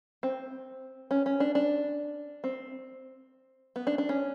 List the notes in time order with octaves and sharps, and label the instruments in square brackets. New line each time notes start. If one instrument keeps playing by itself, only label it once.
[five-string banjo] C4
C#4
C#4
D4
D4
C4
B3
D4
D4
C#4